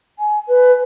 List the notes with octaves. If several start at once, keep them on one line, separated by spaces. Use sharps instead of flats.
G#5
B4